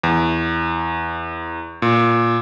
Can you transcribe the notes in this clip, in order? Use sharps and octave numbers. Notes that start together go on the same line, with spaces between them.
E2
A#2